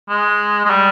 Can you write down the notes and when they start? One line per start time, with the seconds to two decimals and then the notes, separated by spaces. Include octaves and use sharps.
0.09 G#3
0.65 G#3
0.70 G3